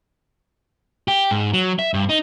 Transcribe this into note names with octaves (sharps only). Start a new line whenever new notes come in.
G4
G#2
F#3
E5
G2
D#4